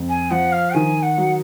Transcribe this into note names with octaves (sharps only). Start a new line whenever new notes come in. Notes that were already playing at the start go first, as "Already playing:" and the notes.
Already playing: F2
G#5
F3 F#5
F5
D#3 G#5
F#5
F#3